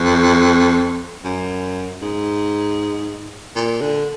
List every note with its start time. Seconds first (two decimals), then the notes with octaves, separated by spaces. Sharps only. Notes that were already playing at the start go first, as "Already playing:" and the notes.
Already playing: F2
1.25 F#2
2.02 G#2
3.56 A#2
3.81 D3